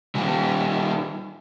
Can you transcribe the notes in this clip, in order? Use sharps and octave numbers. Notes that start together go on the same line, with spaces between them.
D#3 G3